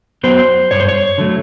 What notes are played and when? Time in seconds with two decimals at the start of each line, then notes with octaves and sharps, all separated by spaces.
0.24 F#3 B3 C5
0.71 G2 C#5
0.80 C5
0.88 C#5
1.18 D3 F#3 A3